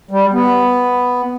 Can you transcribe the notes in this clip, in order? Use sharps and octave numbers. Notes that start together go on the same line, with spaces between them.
G3
B3